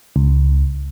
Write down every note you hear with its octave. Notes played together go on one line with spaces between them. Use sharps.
C#2